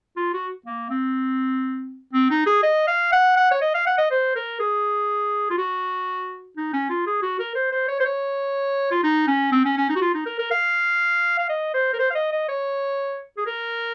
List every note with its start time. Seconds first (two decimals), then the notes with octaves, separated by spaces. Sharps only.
0.17 F4
0.34 F#4
0.66 A#3
0.90 C4
2.13 C4
2.30 D#4
2.46 G#4
2.63 D#5
2.88 F5
3.13 F#5
3.37 F#5
3.52 C#5
3.62 D#5
3.74 F5
3.87 F#5
3.98 D#5
4.11 C5
4.36 A#4
4.60 G#4
5.50 F4
5.58 F#4
6.57 D#4
6.74 C#4
6.90 F4
7.07 G#4
7.22 F#4
7.39 A#4
7.55 C5
7.72 C5
7.88 C#5
8.00 C5
8.05 C#5
8.91 F4
9.04 D#4
9.27 C#4
9.52 C4
9.65 C#4
9.77 C#4
9.89 D#4
9.96 F#4
10.02 F4
10.15 D#4
10.26 A#4
10.39 A#4
10.51 F5
11.39 F5
11.49 D#5
11.74 C5
11.94 A#4
11.99 C5
12.10 F5
12.15 D#5
12.32 D#5
12.49 C#5
13.38 G#4
13.46 A#4